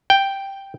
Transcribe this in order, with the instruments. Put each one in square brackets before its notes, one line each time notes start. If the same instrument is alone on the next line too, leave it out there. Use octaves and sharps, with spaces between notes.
[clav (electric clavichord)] G5